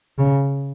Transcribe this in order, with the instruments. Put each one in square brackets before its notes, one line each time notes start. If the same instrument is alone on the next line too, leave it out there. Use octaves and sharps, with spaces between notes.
[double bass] C#3